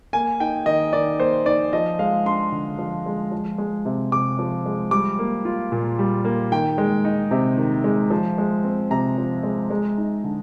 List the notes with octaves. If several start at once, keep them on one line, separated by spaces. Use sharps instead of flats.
A#3 G#5
D#4 G5
D#3 D#5
D#3 D5
A#3 C5
D#4 D5
F3 D#5
G#3 F5
D4 C6
D3
F3
G#3
F3
G#3
C3
C3 D6
F3
G#3
G3 D6
A#3
F4
A#2
G3
A#3
D#3 G5
G#3
D#4
C3
D#3
G#3
F3
G#3
C4
C3 A#5
F3
G#3
G#3
D#4
D3